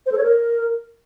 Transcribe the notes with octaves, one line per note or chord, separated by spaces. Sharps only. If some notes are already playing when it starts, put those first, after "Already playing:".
C5
A4
C#5
A#4